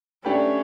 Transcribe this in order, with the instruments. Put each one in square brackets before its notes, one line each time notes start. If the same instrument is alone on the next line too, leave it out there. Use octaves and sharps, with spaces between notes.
[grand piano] A3 D4 G4 B4 [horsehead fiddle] C#4